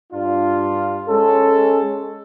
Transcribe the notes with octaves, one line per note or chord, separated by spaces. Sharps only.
G2 D4 F4
G#3 C#4 A4